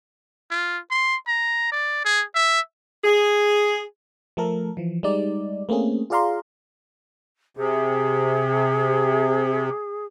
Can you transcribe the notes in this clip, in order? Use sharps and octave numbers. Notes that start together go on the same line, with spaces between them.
F4
C6
A#5
D5
G#4
E5
G#4
F3 A3 A4 A#4
E3 F3
G3 G#3 D#4 D5
A3 A#3 C4 C#4 G#4
F4 G#4 D5 F5 A#5 C6
C3 G#4